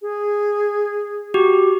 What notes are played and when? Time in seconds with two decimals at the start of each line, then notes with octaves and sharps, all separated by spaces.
0.02 G#4
1.34 F#4 G4